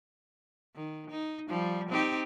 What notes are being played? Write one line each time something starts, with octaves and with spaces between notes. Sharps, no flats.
D#3
D#4
F3 G3
C4 D#4 G4